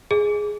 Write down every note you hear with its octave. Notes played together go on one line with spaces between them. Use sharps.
G#4